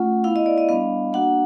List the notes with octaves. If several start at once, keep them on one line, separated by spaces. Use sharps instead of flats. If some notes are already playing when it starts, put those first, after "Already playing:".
Already playing: A3 C#4 F4 F#5
B3 E4 F5
D#5
D5
D#5
G3 B3 D4 F5
A#3 D4 F#4 F#5